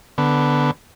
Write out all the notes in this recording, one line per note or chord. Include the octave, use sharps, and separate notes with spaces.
D3 B3